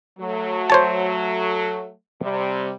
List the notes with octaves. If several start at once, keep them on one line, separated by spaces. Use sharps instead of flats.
F#3 A3
C5 C#5 A5
C3 G3